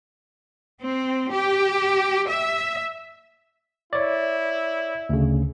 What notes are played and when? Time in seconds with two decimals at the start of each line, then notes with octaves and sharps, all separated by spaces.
0.80 C4
1.31 G4
2.27 E5
3.93 E4 C#5 D5
5.09 D2 C#3